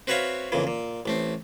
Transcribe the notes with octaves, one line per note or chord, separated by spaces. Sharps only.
C4 F#4 B4 C#5 E5 F5
F2 A#2 C#3 E3
A#2
A1 A3 C4